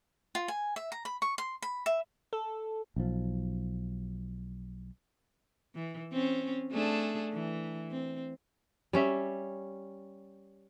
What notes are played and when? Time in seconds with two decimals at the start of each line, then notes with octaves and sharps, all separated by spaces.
0.35 F4
0.48 G#5
0.76 E5
0.92 A#5
1.05 B5
1.22 C#6
1.38 C6
1.62 B5
1.86 E5
2.33 A4
2.96 B1 F3
5.75 E3
6.13 C4 C#4
6.72 A3 D4 G#4
7.33 E3
7.91 C4
8.93 G3 C#4 E5